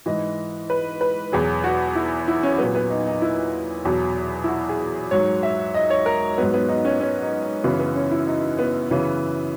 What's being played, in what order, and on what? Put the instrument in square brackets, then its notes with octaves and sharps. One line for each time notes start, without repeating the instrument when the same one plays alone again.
[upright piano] G#2 E3 D#5
B4
B4
E2 B2 F#3 G#4
F#4
E4
E4
C#4
A#2 F#3 B3
B3
D#4
D#4
E4
E2 B2 F#3
E4
F#4
G#4
G#2 F#3 C#5
E5
D#5
C#5
A#4
G#2 F#3 B3
B3
D#4
C#4
C#4
D#4
D#4
F#2 C#3 E3 B3
B3
C#4
E4
D#4
B3
F#2 C#3 E3